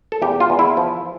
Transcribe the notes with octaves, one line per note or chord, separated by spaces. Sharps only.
A4
E2 G4
F4
E2
E4
F3